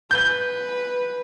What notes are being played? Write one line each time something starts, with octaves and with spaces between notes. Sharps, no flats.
B4 G6 G7